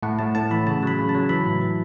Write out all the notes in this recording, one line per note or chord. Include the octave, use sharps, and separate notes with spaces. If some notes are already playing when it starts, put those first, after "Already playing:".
A2 F#5
A2 A5
A2 A5
E3 B5
C#3 A5
F#3 B5
C#3
A5
F#3
E3 B5
A2
E3